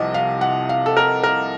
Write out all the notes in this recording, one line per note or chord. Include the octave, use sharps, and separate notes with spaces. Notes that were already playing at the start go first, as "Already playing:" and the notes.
Already playing: C2 C3 F3 D#5 F#5
F5
F#5
F5
A4
A#4
A#4